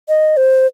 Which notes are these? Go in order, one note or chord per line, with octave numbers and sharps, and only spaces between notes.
D#5
C5